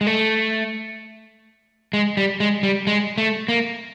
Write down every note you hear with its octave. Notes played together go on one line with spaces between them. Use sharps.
G#3
A3
G#3
G3
G#3
G3
G#3
A3
A#3